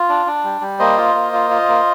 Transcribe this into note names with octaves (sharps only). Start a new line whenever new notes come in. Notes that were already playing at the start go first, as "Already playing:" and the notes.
Already playing: F4
D4
D4
G3
G3
A#3 C5 D#5
F4
A#3
F4
F4
A#3